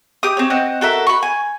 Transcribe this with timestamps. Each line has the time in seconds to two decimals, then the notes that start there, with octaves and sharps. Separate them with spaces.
0.23 G4 D6 D#6
0.37 C4 C#5
0.50 C4 D#5 F#5
0.81 F#4 A4 A#4 E5
1.07 B5 C#6
1.23 G#5